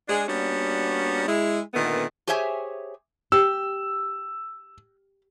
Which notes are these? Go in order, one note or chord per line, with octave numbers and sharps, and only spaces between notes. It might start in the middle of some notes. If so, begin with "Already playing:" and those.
G#3 D4 G#4
G3 A#3 B3 C#4 D4 F#4
G#3 E4
A#2 D3 D#3 A3 B3
G4 G#4 C5 C#5 E5 G#5
G4 E6